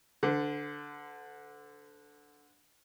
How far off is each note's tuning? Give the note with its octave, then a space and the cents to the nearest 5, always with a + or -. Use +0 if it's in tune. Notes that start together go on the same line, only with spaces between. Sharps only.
D3 +0 C5 -45